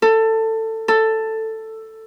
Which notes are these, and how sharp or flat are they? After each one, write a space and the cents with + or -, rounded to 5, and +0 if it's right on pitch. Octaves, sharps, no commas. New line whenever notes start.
A4 +20
A4 +10